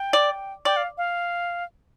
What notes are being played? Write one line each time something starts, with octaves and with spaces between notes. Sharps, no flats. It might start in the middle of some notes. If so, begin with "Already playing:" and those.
Already playing: G5
D5
D5 G5
F5
F5